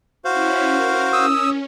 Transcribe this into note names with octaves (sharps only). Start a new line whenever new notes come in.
C#4 E4 F#4 C5 F5
A#4
C#4 D#6 E6